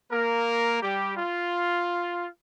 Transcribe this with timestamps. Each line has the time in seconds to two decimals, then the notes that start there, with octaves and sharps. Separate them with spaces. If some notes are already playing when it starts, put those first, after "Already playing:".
0.12 A#3 A#4
0.82 G3 G4
1.17 F4